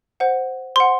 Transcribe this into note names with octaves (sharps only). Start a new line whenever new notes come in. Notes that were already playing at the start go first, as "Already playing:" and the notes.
C5 F#5
C5 F#5 C6